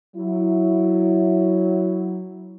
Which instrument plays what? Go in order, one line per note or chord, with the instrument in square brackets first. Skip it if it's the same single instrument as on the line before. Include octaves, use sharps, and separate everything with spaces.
[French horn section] F#3 E4